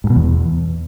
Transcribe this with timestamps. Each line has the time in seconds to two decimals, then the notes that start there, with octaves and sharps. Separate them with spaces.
0.04 G#2
0.10 B2
0.16 E2